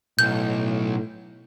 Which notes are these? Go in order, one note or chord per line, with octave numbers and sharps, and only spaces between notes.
B1 A2 G6